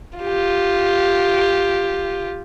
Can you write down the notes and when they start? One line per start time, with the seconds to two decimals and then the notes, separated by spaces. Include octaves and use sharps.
0.19 F4 G4